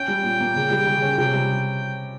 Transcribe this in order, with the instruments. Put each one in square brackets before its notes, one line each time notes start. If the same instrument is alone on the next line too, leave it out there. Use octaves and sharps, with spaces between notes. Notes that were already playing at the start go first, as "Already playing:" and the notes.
Already playing: [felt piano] C#4 [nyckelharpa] G5
[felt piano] G3
A#2
A#3
C#3
G3
C#3
C#4
C3
G3